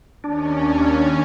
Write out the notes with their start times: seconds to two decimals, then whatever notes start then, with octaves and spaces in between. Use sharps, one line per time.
0.24 D#2 C#4 D4